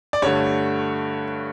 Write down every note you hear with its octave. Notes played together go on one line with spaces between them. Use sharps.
D5
G2 D3 A3 C#5